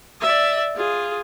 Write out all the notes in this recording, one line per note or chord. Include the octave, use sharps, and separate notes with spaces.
D5 E5
F4 G#4